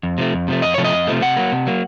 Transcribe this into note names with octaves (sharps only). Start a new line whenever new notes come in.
F2
C3 F3 A3
F2
C3 F3 A3
F2 D#5
C3 F3 A3 C#5
D#5
F2
C3 F3 A3
C3 F#5
F#3 A#3
C3
F#3 A#3